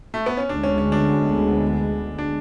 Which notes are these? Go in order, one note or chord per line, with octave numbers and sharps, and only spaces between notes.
A3
B3
C#4
D2 D3 G#3 B3 D4
C#4
C#4
D4
D4